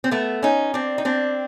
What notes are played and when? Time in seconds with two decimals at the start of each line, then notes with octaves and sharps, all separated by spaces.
0.04 C4
0.11 A3 B3
0.43 C#4 D#4
0.74 C4 D4
0.98 D#4
1.05 C4 D4